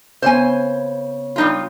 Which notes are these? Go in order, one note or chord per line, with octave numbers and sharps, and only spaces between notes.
C#3 B3 C5 G#5
G3 D#4 F4